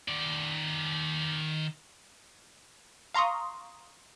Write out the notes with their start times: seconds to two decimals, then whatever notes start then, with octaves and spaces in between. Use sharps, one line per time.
0.08 D#3 D5
3.14 F5 A#5 C6 C#6 D#6